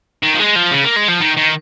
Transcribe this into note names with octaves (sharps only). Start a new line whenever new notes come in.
D#3
F3
G#3
F3
C#3
A#3
G#3
F3
D#3
D#3